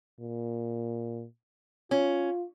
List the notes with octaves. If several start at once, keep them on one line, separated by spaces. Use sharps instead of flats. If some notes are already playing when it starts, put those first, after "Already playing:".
A#2
C#4 F4